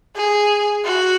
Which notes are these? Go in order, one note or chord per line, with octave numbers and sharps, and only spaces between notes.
G#4
F#4